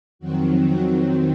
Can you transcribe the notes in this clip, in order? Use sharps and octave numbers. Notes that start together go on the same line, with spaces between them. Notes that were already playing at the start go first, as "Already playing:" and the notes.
F2 D#3 F#3 C4 F#4
F#4